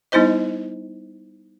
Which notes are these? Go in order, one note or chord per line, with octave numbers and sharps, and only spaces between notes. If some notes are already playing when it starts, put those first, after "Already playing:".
G3 B3 D#4 E4 C5 D#5